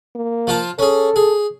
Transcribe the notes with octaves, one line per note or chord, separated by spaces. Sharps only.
A#3
F3 F4 A5
C#4 G#4 A4
G#4